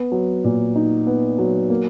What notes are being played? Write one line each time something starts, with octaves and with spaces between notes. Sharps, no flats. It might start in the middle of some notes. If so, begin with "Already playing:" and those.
Already playing: B3
F#3
A#2
D#4
B3
F#3
A#3